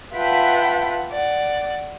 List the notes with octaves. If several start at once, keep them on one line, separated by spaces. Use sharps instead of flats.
F4 B4 E5 F#5 G5 A5
D5 F#5